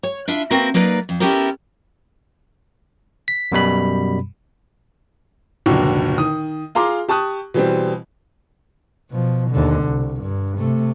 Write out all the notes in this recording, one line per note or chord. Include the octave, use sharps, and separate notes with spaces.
C#5
D4 E4 F4 E5
A#3 C4 F#4 A#4 B4
F#3 A#3 D#4 B4 D5
F2
B3 C#4 E4 G4 A4 A#4
B6
F#2 B2 G3 B5
F1 C#2 A#2 D3 F#3 C#6
D#3 D#6
F4 G#4 A#5 C6 D6
G4 A5 C#6 D#6 F#6
B2 E3 G3 C4
B2 F3
D#2 D3
C2
G2
C3 A3